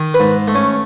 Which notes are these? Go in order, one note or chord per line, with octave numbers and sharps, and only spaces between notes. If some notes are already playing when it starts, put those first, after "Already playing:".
Already playing: D#3
B4
G#2
A3
C#4